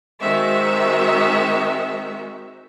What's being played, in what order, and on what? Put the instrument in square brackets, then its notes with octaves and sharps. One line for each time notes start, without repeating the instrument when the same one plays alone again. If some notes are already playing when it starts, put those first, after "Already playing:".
[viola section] D#3 G#3 C4 F#4 E5